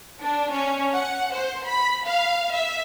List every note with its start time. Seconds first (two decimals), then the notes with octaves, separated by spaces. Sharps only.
0.21 D4
0.52 C#4
0.92 F#5
1.33 C5
1.65 B5
2.06 F5
2.52 E5